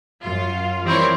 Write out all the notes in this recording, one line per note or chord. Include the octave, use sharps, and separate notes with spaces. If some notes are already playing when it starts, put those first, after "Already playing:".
F#2 F4
E3 G3 C4 E4 A#4 C#5